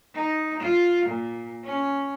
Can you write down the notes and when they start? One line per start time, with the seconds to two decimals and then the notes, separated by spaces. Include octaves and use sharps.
0.15 D#4
0.60 F4
1.06 A#2
1.64 C#4